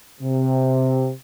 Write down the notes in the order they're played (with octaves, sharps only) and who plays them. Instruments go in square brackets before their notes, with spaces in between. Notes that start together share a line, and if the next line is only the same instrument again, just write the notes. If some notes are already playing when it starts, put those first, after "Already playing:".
[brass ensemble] C3